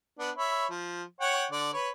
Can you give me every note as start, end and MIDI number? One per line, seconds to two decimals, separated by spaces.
0.19 0.31 59
0.19 0.31 62
0.37 0.66 73
0.37 0.66 76
0.37 0.66 83
0.70 1.03 53
1.21 1.46 73
1.21 1.46 78
1.21 1.46 79
1.52 1.70 50
1.52 1.70 74
1.74 1.90 71
1.74 1.90 73